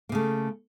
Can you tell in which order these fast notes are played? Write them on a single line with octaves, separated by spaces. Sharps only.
A#3 C#3 A3